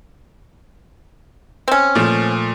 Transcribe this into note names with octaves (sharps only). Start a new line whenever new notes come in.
C4 C#4
A#2 F3 A3